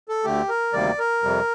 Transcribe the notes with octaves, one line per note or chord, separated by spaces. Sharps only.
A4
D2 D3 A3 G4
A#4
D2 C3 D#3 G3 A#3 D5
A#4
F2 C3 G3